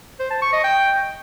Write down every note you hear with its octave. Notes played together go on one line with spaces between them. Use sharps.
C5
A5
C#6
D#5
G5